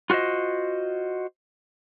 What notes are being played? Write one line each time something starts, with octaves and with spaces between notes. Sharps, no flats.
F4 F#4 B4 C5 D#5